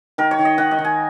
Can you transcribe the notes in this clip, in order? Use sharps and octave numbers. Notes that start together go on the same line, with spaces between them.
D#3 A#4
C#5
D#3
D#5
D#3 F#5
D#5
D#3
G#5